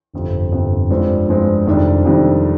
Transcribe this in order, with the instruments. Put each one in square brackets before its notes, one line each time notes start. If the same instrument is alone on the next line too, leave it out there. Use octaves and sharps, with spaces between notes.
[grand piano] G1 F2 C3
G1 F2 C3
G2 F3 G#3 C4
G2 F3 G#3 C4
F2 C3 D#3 G3 D4
F2 C3 D#3 G3 D4